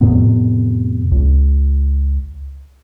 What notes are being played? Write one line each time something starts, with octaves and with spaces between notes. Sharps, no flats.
F2 A2 C3 B3
C#2